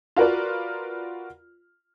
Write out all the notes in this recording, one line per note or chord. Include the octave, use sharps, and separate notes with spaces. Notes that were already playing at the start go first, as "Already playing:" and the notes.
F4 F#4 A#4 B4 D5